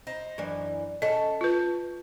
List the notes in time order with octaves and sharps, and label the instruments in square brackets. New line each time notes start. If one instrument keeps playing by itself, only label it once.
[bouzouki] D#4 C5
[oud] F#2 E3 D4
[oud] C#4 A4 [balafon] D#5 [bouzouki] A5
[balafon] F4 B4